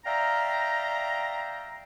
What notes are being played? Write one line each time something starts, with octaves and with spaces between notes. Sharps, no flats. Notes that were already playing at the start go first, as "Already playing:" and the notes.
D5 E5 F5 G5 A#5